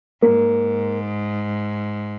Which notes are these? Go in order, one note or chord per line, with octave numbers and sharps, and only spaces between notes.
G#2 A#3